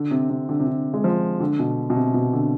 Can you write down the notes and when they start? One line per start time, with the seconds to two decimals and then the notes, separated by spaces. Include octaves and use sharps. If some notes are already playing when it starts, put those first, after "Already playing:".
Already playing: D3
0.11 C3
0.30 C3
0.49 D3
0.60 C3
0.67 D3
0.94 G#3
1.04 F3
1.40 D3
1.59 B2
1.90 B2
1.95 C3
2.14 B2
2.33 D3